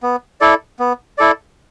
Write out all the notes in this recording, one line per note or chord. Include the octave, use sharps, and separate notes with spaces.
B3
E4 A4 D5
B3
E4 A4 D5